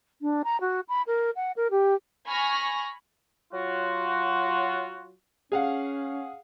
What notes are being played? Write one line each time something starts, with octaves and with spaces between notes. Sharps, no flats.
D4
A#5
F#4
B5
A#4
F#5
A#4
G4
G#5 B5 C#6 F6 A#6
F#3 F4 F#4
C#4 G#4 F5 F#5